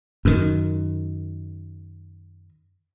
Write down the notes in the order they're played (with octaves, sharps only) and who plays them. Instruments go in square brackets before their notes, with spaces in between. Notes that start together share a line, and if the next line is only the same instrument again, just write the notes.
[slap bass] F#2 D#3